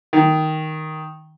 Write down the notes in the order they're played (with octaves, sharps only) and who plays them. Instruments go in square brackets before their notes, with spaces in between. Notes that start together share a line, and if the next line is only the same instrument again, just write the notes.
[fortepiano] D#3